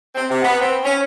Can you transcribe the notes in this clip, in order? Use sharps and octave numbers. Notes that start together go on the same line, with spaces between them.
C4
C3
B3
C4
C#4